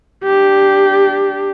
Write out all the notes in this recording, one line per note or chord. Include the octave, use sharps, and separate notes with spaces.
D4 G4